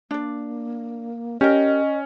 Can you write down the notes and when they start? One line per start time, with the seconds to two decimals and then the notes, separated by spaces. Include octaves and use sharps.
0.11 A#3 D4 D5
1.41 C#4 G4 A#4 D#5